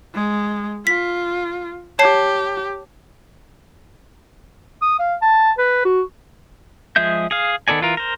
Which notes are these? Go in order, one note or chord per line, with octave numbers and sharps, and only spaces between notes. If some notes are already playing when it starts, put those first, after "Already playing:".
G#3
F4 B6
G4 C#5 A5 C7
D#6
F5
A5
B4
F#4
F3 G#3 G#4 E5 G6
G#4 F5
D#3 B3 A4 D5 G#5
E3 F4 A#4
A#4 C5